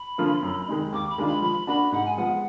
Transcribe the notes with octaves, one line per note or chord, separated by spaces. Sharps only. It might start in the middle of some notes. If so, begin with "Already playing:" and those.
Already playing: B5
D3 F3 A#3 F4
F#2
D#3 G#3 D#4
D#2 D6
B5
D#3 G#3 D4 F4
B5
F3 B5
A#3 D4 F#4 B5
G#2 F#5
G#5
F3 G#3 B3 F#5